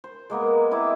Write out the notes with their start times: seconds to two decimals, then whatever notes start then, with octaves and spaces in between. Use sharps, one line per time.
0.04 C5
0.30 G#3 A#3 B3 A#4
0.71 C4 E4 D#5 D6